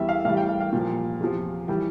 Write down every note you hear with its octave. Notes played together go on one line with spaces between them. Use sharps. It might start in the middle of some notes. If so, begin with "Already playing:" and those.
Already playing: E2 E3 G3 E5
F5
A2 E3 G3 F5
G5
F5
F5
A#2 F3
E2 C3 F3
E3 G3 G5